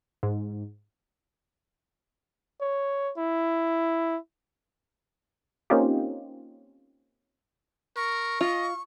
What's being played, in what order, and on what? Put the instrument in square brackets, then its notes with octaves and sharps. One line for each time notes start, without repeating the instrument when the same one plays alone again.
[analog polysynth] G#2
[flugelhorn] C#5
E4
[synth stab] A#3 C4 C#4 D#4 F4 G4
[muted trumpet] A#4 [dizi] C#6
[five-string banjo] F4 [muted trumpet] D#5